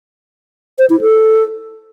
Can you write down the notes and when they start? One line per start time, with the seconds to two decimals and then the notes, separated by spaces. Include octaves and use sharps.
0.79 C5
0.90 E4
1.01 A4